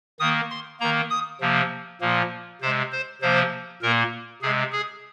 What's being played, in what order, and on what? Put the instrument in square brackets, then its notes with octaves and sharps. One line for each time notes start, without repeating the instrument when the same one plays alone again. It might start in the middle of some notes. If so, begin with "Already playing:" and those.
[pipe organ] D#3 A#3 D#6
C6
D#3 A#3 A#5
D#6
C3 F3 A#3
A#2 F3 A#3
C3 G#3 C5
C5
C3 F3 A#3 C5
A#2 A#3 A#4
C3 G#3 G#4
G#4